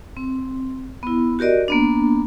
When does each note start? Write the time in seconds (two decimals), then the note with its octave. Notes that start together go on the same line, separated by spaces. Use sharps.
0.17 C4
1.03 B3 E4
1.39 F#4 G4 A#4 D5 D#5
1.68 A#3 B3 D4